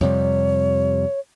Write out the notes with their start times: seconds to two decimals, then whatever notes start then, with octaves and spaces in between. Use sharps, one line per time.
0.01 F2 C3 G3 C#5